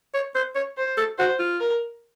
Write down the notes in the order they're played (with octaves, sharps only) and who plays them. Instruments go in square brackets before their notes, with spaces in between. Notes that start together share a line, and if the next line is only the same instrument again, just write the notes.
[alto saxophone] C#5
C5
C#5
[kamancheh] C5
[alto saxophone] A4
[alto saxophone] F#4 [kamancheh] C5
[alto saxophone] F4
[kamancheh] A#4